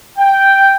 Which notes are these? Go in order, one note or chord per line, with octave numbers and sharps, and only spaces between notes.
G5